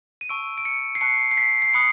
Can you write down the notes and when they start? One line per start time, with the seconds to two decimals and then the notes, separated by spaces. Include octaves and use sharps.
0.21 D#7
0.29 A5 C#6 E6 D7
0.58 D7
0.65 C#7
0.95 C7
1.01 A5 C#6 F#6 C#7
1.31 C7
1.37 B6
1.62 C7
1.74 B5 D#6 F#6 C#7